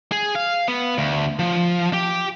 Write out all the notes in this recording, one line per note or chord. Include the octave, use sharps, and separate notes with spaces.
G#4
F5
B3
D2
F3
G4